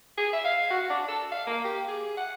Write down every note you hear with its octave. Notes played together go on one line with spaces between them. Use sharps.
G#4
E5
F5
F#4
D4
A4
F5
A#3
G4
G#4
F#5